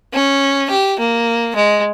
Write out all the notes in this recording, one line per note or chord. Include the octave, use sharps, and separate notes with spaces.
C#4
G4
A#3
G#3